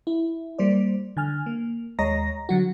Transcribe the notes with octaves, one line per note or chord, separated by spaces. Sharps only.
E4
G3 A#3 C5 D5
D3 G#5 F6
A#3
D#2 G#3 C#5 D#5 A#5 A#6
D3 F#3 F#4